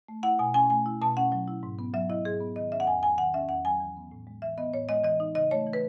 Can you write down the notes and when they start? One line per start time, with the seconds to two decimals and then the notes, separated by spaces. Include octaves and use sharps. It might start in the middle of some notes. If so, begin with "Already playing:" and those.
0.08 A3
0.23 E4 F#5
0.39 B2 G#5
0.54 C#4 G#5
0.70 A3 G#5
0.86 E4
1.02 B2 A5
1.17 C#4 F#5
1.32 F#3
1.48 E4
1.63 G#2
1.79 B3
1.94 F#3 E5
2.10 E4 D#5
2.25 G#2 G#4
2.41 B3
2.56 D#3 D#5
2.72 C#4 E5
2.80 F#5
2.87 E2 G#5
3.03 F#3 G#5
3.18 D#3 F#5
3.34 C#4 E5
3.49 E2 F#5
3.65 F#3 G#5
3.80 E3
3.96 B3
4.11 A2
4.27 G#3
4.42 E3 E5
4.57 B3 D#5
4.73 A2 C#5
4.89 G#3 D#5
5.04 E3 D#5
5.20 D#4
5.35 C#3 D#5
5.51 A3 C#5
5.67 E3
5.73 B4